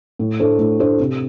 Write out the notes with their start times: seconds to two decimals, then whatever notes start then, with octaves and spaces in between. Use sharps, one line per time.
0.19 A2
0.40 A3 D4 A4 C5
0.59 A2
0.79 A3 D4 A4 C5
1.00 C3